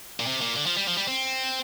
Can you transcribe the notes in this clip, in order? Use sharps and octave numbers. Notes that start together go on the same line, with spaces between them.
A#2
C3
A#2
D3
F3
G3
F3
G3
C4